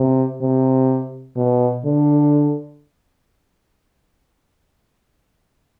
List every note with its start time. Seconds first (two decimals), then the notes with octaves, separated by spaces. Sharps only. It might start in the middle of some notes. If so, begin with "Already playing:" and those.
Already playing: C3
0.42 C3
1.36 B2
1.85 D3